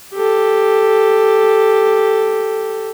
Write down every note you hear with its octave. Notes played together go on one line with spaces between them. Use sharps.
G4 A4